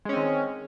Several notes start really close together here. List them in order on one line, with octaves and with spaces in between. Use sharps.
G#3 C#4 C4 D#3